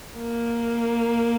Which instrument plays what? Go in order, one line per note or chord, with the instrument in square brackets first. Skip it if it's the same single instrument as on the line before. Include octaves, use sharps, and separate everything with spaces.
[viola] A#3